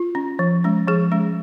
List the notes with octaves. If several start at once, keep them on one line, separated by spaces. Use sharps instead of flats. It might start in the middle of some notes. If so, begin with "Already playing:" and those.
Already playing: F4
C#4
F3
G#3 C#4
F3 G#4
G#3 C#4